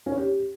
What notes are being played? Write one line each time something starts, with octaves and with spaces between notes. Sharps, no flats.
C#4
C#5
G4